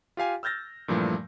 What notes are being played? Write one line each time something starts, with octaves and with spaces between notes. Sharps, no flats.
F4 G4 F5 G#5
E6 F6 G6 A6 A#6
G2 A#2 E3 F3 G3 A3